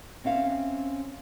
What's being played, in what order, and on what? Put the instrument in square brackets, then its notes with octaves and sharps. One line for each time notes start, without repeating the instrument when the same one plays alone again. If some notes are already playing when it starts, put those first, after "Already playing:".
[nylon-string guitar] C4 C#4 E5 F5